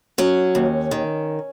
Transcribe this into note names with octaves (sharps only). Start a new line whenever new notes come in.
F#3 C#4
D#2
D#3